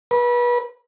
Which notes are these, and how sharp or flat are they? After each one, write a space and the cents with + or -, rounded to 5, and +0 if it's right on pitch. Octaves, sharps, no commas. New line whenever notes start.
B4 -30